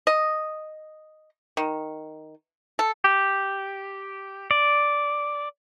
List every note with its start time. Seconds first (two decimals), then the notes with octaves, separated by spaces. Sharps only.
0.07 D#5
1.57 D#3
2.79 A4
3.04 G4
4.51 D5